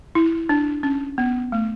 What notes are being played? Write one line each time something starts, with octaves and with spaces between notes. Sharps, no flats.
E4
D4
C#4
B3
A3